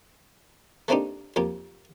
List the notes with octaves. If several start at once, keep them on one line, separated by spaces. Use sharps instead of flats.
A3 A#3 C4 D4 D#4 G4
F2 A#3 G4